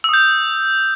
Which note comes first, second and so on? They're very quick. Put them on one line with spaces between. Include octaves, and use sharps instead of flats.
E6 D#6 G6